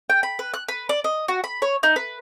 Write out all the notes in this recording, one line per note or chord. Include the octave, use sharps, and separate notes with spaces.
G5
B5
B4
F#6
B4
D5
D#5
F#4
B5
C#5
D#4
B4